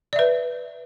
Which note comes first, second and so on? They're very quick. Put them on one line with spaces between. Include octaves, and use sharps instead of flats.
D5 E5 B4